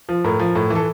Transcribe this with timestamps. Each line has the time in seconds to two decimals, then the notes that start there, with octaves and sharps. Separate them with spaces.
0.09 F3
0.24 A2 A#4
0.40 F3
0.55 A2
0.70 E3 A4